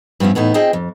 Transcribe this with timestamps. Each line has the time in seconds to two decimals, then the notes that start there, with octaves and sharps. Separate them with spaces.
0.20 G2 F3 B3 C#4 E4
0.35 E2 A2 B3 D#4
0.54 C4 F4 G#4 D#5 G5 A5
0.73 F2